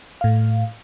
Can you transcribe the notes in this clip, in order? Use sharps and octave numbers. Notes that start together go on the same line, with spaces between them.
A2 F5